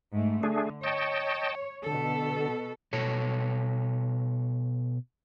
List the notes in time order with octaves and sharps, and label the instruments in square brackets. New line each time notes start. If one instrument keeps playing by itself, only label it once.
[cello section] G#2 A3
[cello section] D3 [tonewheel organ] A3 D4 G#4
[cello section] C#5 [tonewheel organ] D#5 G5 A5
[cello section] B2 A4 [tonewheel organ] D3
[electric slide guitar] B2 A4 C#5